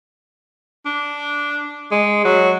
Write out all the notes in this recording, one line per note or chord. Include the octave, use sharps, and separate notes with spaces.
D4
G#3
F#3